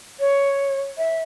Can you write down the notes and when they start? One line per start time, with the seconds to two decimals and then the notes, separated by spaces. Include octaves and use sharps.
0.20 C#5
0.98 E5